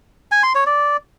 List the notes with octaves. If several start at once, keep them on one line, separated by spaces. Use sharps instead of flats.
G#5
C6
C#5
D5